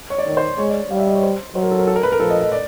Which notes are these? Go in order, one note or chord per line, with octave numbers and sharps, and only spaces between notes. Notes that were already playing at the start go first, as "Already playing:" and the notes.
C#5
D5
D#3 C#5
C5
G#3 C#5
D5
G3 F5
E5
D#5
C#5
C5
F#3 C5
A#4
A4
A#4
A4
A#4
B4
A#4
F3 A4
D#5
D#5
D5